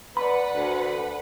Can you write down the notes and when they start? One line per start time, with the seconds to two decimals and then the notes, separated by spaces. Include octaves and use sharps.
0.17 B4 D5 F#5 B5
0.53 D2